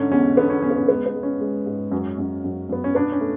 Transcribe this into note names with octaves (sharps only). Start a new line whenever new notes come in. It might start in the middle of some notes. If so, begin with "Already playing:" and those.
Already playing: G#2 D3 C#4
E2 C#4
D3 B3
C#4
E2 C#4
B3
C#4
G#3 B3
B3
G#3
C#4
G#3
G#2
F#2 C#4
F#2
F#2
F#2 B3
C#4
B2 B3 D4
C#4
A3